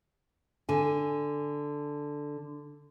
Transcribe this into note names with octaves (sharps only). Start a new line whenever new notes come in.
D3 G#5